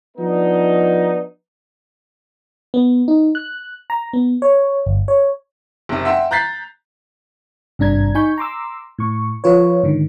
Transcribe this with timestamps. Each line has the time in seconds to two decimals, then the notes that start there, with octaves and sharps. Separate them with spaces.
0.17 F3 B3 D4 D#4
2.74 B3
3.08 D#4
3.35 F#6
3.90 A#5
4.13 B3
4.42 C#5
4.86 G1
5.08 C#5
5.89 F#1 C3
6.05 E5 F#5 G5 C6
6.31 A#5 F#6 G6 A6 B6 C7
7.79 G#1 G2 C3 D4 A#5 G#6
8.15 D#4 G#5 B5 C#6 G6
8.38 A#5 C6 D6 E6
8.98 A2 C#6
9.44 F3 F4 B4 C#5
9.83 G#2 D3 D#3